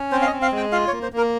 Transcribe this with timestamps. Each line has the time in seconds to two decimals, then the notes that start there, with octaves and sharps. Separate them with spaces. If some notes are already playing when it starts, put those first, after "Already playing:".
Already playing: C#4
0.12 C4 C5
0.22 F5
0.27 D#5
0.32 C4
0.42 F5
0.52 G#3 G5
0.72 F4 F5
0.88 C#5
0.92 A#3
1.02 C5
1.13 A#3 A#4